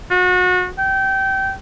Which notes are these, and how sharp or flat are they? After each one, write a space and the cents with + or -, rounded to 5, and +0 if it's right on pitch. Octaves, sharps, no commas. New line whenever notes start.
F#4 -30
G5 -25